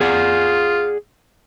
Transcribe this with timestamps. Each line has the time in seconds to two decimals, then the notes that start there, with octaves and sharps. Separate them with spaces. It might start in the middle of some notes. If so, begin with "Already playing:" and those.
0.01 F4 G#4 D5 F#5